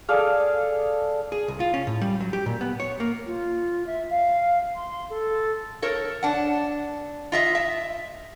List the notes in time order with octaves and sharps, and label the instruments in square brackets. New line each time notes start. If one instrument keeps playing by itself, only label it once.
[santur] G#4 A4 D5 F5
[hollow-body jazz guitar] G#4
C2
F4
C#4
A2
G3
F#3
G4
A#2
B3
C#5
A#3
[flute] F4
E5
F5
C6
A4
[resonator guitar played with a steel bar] A4 A#4 C#5
D4 F#5
F4 D#5 E5
E5